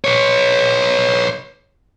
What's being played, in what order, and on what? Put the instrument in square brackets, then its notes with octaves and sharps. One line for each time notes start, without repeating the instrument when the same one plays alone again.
[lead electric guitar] B4 C#5